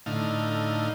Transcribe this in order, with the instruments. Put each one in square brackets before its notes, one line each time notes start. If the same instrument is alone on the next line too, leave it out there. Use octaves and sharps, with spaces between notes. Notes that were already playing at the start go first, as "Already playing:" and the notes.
[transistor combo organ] A2 D3 D#4 F5